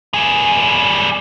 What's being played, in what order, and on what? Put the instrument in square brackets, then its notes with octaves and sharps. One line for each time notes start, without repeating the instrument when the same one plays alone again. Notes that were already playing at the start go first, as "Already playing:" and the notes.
[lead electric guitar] G3 G#4